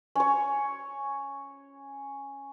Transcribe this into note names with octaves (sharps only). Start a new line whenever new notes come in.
C#4 C#5